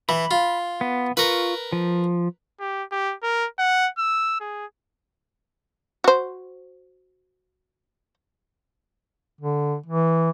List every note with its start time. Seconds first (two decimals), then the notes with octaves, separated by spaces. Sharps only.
0.09 E3 B5
0.31 F4
0.81 B3
1.17 F4 A#4 B4 C#6
1.73 F3
2.60 G4
2.91 G4
3.23 A#4
3.59 F#5
3.98 E6
4.40 G#4
6.04 F#4 C5
9.40 D3
9.86 E3